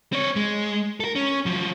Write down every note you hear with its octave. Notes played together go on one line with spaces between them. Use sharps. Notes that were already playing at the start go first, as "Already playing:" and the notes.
C4 C#5
G#3
A4 A#4
C#4
F3 F#3